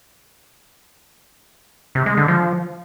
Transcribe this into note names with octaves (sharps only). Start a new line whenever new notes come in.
C3
G#3
D3
F3